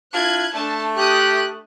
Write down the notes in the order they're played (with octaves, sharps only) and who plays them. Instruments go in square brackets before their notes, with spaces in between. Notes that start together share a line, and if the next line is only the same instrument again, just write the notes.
[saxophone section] D4 E4 F4 [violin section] F#6 G#6
[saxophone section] A3 [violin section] D4 A5
[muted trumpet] G4 [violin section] D#6 F#6